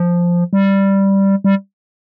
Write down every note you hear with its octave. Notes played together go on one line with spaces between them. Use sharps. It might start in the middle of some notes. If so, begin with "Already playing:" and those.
Already playing: F3
G3
G3